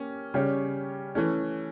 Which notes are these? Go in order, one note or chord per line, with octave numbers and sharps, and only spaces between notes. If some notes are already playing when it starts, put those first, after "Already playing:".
Already playing: A#3 C#4 G4
C#3 G3 C#4 G4 C#5
E3 A3 C#4